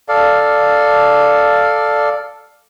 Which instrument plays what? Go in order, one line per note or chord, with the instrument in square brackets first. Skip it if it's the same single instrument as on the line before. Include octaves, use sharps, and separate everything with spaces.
[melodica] A4 D5 F5